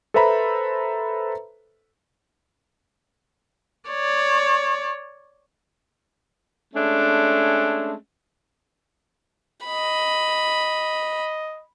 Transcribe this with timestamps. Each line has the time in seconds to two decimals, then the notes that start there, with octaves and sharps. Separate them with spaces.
0.14 A4 B4 C5 E5 A#5 B5
3.89 C#5 D5
6.74 G#3 A3 C#4 D4
9.65 D#5 B5